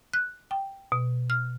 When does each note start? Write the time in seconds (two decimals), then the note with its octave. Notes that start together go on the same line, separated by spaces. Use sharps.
0.14 F#6
0.51 G5
0.92 B2
1.30 F6